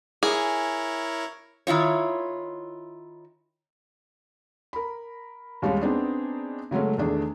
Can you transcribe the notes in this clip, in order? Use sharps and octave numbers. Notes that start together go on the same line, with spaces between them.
E4 G#4 A#4 C#5
D#3 E4 F4 C#5
A#4 B5
D#2 G3 G#3 C#4
B3 C4 D4 D#4 G#4
C#3 F#3 G#3 A3 C#4
E2 D#3 A3 D4 G#4